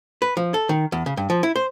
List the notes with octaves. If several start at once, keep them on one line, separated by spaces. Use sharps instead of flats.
B4
F3
A4
D#3
E2
C#3
G2
F3
E4
C5